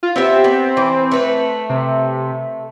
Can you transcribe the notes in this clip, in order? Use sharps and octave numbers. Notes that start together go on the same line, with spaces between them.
F4
B3 C4 G4 E5
B3
E3
A3 B4
C3